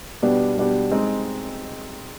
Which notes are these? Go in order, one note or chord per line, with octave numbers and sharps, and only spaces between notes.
B2 G3 B3 D4 G4
B2 G3 B3 D4 G4
G#3 C4 D#4